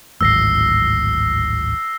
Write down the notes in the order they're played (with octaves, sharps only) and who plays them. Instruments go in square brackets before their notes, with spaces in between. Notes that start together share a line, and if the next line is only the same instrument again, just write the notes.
[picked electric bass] D1 G#1 [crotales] E6 A#6 C7